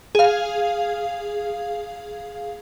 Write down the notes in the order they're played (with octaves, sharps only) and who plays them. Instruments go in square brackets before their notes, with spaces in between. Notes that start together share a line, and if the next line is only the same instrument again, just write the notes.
[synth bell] G#4 F5